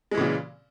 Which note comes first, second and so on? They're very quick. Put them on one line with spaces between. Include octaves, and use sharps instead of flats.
G#3 E3 C#3 A#2